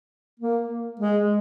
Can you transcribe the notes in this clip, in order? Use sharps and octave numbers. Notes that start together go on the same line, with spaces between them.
A#3
G#3